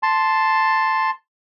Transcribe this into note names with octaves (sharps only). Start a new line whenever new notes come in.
A5 C6